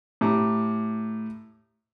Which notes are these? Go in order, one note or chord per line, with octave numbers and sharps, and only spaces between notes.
A2 G4 A#5